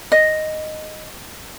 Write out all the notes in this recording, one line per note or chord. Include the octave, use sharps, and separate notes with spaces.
D#5